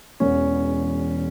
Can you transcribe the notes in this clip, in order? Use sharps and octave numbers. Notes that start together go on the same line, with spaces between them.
E1 E2 E3 B3 C#4 C#5